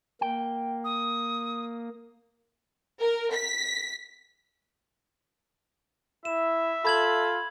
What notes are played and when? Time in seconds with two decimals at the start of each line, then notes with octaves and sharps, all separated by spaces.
0.21 A#3 G5
0.84 D#6
3.01 A#4
3.33 B6
6.25 E4 E5 E7
6.85 F4 A4 B5 G#6 F#7